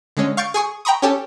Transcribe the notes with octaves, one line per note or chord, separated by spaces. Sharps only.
D3 G#3 C#4
F5 C#6 G6 A6 D7
G#4 G#5 C#6 D#6
G5 A#5 B5 C#6 D#6
C#4 G4 A4